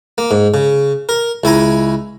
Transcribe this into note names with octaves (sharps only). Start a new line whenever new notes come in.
A#3
G#2
C#3
A#4
C#2 E4 G#5 A#5